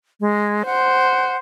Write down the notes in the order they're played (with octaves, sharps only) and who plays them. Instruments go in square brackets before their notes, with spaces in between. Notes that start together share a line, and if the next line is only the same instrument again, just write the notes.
[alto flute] G#3
[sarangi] C5 [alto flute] F#5